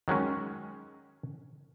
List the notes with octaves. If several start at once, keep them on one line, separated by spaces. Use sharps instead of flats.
D#3 F#3 G#3 C#4